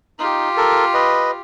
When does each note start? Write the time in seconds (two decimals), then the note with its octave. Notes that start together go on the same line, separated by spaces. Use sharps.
0.19 D#4 F4 G4
0.57 A4 A#4
0.94 B4 D#5